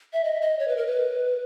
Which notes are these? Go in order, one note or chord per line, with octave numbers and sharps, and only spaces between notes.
E5
D#5
D#5
C#5
B4
A#4
B4